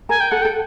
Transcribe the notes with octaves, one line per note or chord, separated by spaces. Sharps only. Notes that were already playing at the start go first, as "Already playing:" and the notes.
A#4 G#5
G5
A4 F#5
A4 G5